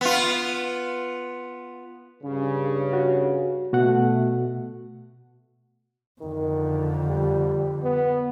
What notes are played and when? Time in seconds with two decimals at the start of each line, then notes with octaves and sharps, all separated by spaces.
0.01 B3 F4
2.24 G2 C#3
2.93 F#4
3.73 B2 A3 F#4 F#5
6.22 F2 D3 D#3
7.09 G3
7.83 B3